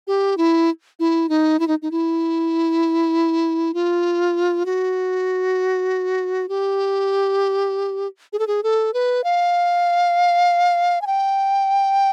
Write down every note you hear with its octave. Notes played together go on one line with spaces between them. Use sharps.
G4
E4
E4
D#4
E4
D#4
D#4
E4
F4
F#4
G4
G#4
A4
G#4
A4
B4
F5
G#5
G5